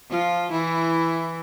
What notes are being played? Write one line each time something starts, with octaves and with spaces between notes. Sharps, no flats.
F3 F4
E3 E4